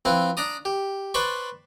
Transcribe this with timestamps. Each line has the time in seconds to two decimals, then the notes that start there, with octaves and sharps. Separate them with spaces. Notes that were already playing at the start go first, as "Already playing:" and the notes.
0.05 F3 C4 E4 B4
0.37 D4 D5 A#5 D#6
0.65 G4
1.14 B4 C5 D5 A5 B5 C#6